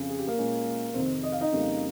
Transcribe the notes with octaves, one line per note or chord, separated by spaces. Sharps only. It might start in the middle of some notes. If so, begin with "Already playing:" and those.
Already playing: F2 C#3 F3
G#4
G4
A#3 A#4
A#2 G#3 C#4 F4
A#4
F2 C3 D#3 C4 C5
D#5
F5
D#4 D#5
F2 C#3 G3 A#3